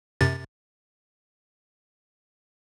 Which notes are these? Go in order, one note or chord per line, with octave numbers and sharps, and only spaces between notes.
F#2 C3 A6